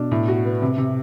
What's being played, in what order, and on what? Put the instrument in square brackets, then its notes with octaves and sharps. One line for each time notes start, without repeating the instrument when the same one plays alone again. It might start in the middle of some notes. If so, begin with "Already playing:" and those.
Already playing: [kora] B2 [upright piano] D4
[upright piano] A2
F#4
B3
C3
C3